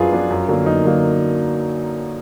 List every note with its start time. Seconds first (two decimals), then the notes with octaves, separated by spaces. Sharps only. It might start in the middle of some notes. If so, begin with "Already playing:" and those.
Already playing: F#2 F3 B3 D4 F4 G#4 B4
0.13 F3 B3 D4
0.31 F#2
0.48 D3 F#3 A#3
0.66 F#2 D#4
0.85 D3 F#3 A#3